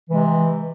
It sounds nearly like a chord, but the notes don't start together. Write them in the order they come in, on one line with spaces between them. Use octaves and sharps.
E3 C3 G#3